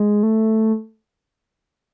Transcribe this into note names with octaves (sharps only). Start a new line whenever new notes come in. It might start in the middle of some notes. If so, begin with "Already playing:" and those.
Already playing: G#3
A3